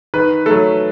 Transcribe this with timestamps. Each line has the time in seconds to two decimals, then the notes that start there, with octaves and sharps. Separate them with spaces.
0.14 D#3 B4
0.46 F#3 A3 A4